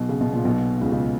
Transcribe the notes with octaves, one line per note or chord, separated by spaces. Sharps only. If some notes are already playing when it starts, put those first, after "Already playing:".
Already playing: B1 B2
C#3
B2
A#2
B1 B2
C#2 C#3
C#2 C#3